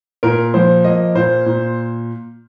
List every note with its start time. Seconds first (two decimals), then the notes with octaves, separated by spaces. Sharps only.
0.23 A#2 A#4
0.54 F3 C5
0.84 A#3 D#5
1.15 A#2 C5
1.46 A#2